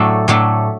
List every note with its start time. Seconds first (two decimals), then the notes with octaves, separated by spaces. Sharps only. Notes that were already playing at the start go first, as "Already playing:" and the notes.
Already playing: A2 F#3 A3 D4 A4
0.28 A2 F#3 A3 D4 A4